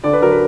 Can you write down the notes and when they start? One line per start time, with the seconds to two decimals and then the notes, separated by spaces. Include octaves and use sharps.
0.04 D3 D5
0.13 B4
0.22 F#3 A#4
0.31 B4